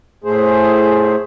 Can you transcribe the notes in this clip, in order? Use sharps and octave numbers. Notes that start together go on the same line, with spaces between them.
A2 A3 G#4 C5